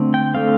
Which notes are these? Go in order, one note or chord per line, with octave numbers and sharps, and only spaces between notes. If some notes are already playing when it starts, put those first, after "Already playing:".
Already playing: D3 A3 C4
G5
D3 A3 C4 F5